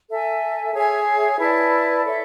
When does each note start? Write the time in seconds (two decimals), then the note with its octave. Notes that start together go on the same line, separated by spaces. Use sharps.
0.09 A4 E5 G#5
0.74 G#4 C#5 E5 G#5
1.39 E4 B4 D5 A5
2.04 A4 C#5 E5